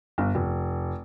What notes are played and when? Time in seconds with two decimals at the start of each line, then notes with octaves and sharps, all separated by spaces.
0.18 G1
0.35 F1